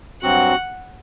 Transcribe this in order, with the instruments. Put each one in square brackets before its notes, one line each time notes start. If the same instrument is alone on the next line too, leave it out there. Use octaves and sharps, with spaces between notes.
[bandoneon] G2 F#3 C4 F#4 [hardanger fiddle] F#5